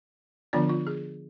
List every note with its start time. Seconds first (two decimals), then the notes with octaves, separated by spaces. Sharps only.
0.53 D3 F3 B3 D4 F4 D5
0.69 F4
0.87 G#4